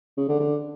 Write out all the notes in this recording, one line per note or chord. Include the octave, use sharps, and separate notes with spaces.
C#3
D3
D3